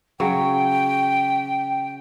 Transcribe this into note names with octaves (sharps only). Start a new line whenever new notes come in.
C#3 F#3 G5